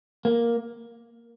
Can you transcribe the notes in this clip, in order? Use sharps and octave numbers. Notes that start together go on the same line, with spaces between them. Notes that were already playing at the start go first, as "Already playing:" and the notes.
A#3